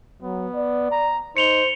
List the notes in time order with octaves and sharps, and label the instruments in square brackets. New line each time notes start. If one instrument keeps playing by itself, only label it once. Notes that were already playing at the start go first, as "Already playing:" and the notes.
[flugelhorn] F#3 [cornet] B3
[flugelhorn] D5
[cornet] A#5
[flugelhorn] D#4 [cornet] C5 [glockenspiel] C#7 F7 G7